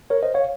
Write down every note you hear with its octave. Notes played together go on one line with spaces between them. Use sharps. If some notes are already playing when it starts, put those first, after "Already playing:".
A#4 C#5
C5 D#5
C#5 F5